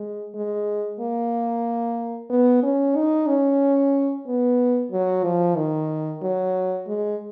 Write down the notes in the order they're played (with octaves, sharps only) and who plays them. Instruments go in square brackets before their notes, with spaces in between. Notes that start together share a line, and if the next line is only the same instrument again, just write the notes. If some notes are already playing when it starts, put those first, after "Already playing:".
Already playing: [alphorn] G#3
G#3
A#3
B3
C#4
D#4
C#4
B3
F#3
F3
D#3
F#3
G#3